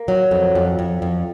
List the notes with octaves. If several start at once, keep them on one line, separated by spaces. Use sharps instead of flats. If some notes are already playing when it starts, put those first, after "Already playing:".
Already playing: A#3
F#3
F2
F2
F2
F2